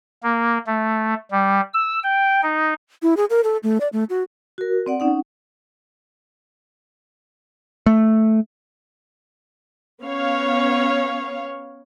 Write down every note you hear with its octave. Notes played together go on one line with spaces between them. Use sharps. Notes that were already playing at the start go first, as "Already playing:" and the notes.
A#3
A3
G3
E6
G5
D#4
E4
G#4
A#4
A4
A3
D5
A3
F#4
F#4 A#4
C4 D5 F#5
C#4 D#4 F#5
A3
B3 C#4 C#5 F5